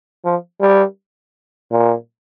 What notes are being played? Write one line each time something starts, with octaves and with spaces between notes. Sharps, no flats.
F3
G3
A#2